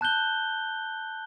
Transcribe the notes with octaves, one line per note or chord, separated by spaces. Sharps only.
A5 F#6 G6 G7